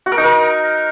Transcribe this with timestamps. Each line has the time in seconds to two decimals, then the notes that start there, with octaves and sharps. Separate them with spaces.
0.06 F#4
0.12 A#4
0.17 D#4
0.23 A#4